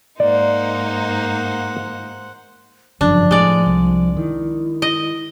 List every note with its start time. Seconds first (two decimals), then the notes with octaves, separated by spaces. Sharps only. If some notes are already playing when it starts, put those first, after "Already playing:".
0.20 G#2 A#3 D#4 C5 D5 F#5
3.01 G1 F#2 C#3 F3 D4
3.31 A2 G#3 D5
3.66 C2
4.17 D#3 E4
4.82 D#5